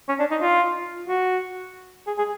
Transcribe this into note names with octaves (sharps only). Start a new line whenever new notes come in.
C#4
D4
D#4
F4
F#4
G#4
G#4